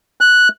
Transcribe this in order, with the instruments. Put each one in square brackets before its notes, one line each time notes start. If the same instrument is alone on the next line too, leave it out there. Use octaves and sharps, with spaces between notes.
[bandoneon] F#6